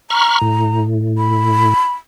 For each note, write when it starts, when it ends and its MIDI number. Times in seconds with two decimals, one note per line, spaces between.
0.10 0.81 82
0.10 0.39 83
0.10 0.39 85
0.10 0.39 89
0.42 1.74 45
1.18 1.92 83